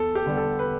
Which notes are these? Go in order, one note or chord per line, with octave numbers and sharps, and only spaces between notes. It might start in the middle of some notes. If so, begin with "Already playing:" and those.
Already playing: E2 A4
G4
D3 G3 B3 D4
A4
B4